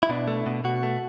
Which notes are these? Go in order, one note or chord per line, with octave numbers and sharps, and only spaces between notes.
E4
B2 D4
A3
B2
B2 F#4
A3